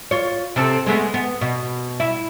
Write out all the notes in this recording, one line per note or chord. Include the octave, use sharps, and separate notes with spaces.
F4 C#5
C3 C4 A4
G#3 A3 B3
B3
B2
E4